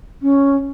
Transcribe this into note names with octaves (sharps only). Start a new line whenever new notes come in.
C#4